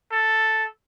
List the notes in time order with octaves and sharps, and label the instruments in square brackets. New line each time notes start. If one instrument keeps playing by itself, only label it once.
[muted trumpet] A4